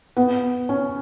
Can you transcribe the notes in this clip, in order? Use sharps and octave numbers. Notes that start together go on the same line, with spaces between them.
B3
C#4